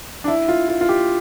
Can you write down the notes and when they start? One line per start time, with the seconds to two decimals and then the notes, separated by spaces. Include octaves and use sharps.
0.24 D4
0.28 E4
0.48 F4
0.69 F4
0.81 F4
0.89 G4